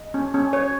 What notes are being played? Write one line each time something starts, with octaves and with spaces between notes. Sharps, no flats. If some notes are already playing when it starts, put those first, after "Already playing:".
Already playing: D#5
C#4
C#4
C#5